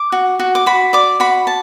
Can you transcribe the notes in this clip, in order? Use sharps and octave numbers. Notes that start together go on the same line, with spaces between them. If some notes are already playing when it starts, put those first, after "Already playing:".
Already playing: D6
F#4
F#4
D6
F#4 B5
D5 D6
F#4 B5
A5